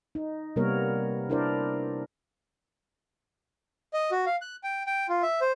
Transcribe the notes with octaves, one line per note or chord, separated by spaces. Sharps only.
D#4
C3 G3 A#3 B3 A#4 C#5
D4 E4 A#4 C5 D5
D#5
F#4
F5
F#6
G5
G5
F4
E5
C5